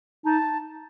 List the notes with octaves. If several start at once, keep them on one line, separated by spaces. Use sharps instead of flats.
D#4 A5